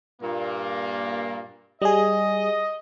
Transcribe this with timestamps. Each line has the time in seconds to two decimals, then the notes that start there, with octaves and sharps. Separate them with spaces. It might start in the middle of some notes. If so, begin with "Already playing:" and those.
0.22 G2 A#2 A#3
1.82 G3 G#4 D#5